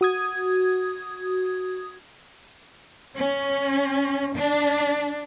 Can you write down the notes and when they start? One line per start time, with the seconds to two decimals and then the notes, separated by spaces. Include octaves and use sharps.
0.01 F#4 D#6 G#6
3.18 C#4
4.36 D4